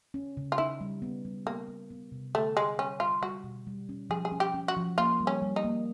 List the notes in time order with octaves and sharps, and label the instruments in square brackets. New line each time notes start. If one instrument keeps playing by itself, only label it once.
[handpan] C#4
C#3
[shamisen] F4
[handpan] D#4 [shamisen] E4
[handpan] G3
B3
G3
[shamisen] A#3 [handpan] B3
[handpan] B3
B3
C3
[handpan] D3 [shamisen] A3
[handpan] G3 [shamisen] G#3
[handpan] G3 [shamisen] C#4
[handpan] G3 [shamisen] F4
[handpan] G3 [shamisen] F#4
[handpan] B2
G3
C#4
[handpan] F3 [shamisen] G#4
[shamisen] G#4
[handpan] C#4
[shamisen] G4
[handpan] C#4
[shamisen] F#4
[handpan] F3
[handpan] A#3 [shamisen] F4
[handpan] G3
[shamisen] C#4
[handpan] G3
[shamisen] D#4
[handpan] A#3